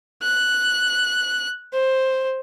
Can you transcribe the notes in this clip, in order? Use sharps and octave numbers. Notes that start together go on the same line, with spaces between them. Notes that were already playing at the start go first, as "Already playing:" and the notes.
F#6
C5